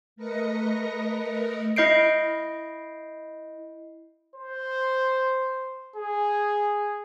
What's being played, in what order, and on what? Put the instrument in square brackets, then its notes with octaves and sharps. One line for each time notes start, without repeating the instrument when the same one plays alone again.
[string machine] A3 A#4 B4 D#5 A#6 C#7
[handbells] E4 D#5 G6 C7 D7
[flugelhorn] C5
G#4